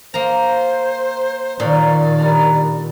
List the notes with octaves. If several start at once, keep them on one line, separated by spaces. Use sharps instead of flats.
A#3 A#4 C5 A#5
A#2 D#3 C#5 D5 A#5 D#6
G3 D4 A#5